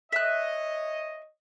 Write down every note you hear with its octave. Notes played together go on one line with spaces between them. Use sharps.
C#5 D#5 E5 F#6